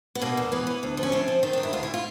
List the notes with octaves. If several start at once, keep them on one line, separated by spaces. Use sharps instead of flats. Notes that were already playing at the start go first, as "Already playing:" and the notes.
B3
B2 A#3
E2
E3 B3
E3
D2
F3
C#4
C3 C4
F3
D#3 C4
G2 D4
E4
D2 F4
E4
F4